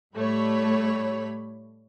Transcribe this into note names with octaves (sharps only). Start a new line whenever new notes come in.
A2 G3 A3 C#5 B5